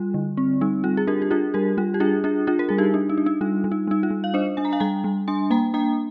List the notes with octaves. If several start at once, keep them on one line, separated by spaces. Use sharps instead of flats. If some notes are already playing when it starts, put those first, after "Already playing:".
Already playing: G3 F4
D3
C4
G3 D#4
G3 F4
G#4
D4 G4 A#4
G4
D4 F4 G#4
G3 G4 A#4
G3 F4
G4
D4 F4 G#4
D4 F4 G#4
D4 F4 G#4
A#4
G3 G#4
D#4 G4
D4
D#4
D4
D#4
G3 F4
G3
D#4
G3 D#4
F4
G3
F5
D4 C5 D#5
D4 G#5
A#5
F5 G#5
G3 G5 A#5
G3
D4 G#5 C6
A#3 G5 A#5
D4 G5 A#5